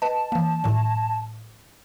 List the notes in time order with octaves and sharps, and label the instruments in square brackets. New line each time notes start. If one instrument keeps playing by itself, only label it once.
[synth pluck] B4 D#5 [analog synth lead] A5
[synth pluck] E3 A#3
A2 D#3 F#3